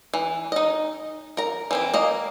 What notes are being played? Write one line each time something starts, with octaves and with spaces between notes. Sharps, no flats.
E3
D#4 D#5
A#4 A#5
E3 C4 E4
A#3 D#5